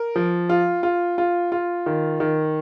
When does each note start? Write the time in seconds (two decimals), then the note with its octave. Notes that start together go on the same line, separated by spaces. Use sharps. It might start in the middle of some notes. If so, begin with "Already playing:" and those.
Already playing: A#4
0.16 F3
0.49 F4
0.83 F4
1.18 F4
1.52 F4
1.86 D#3
2.20 D#3